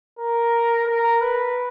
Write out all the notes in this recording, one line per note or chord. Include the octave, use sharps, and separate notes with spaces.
A#4
A#4
B4